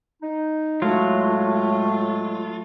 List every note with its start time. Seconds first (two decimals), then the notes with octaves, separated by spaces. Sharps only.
0.22 D#4
0.82 A2 F#3 G#3 A3 F4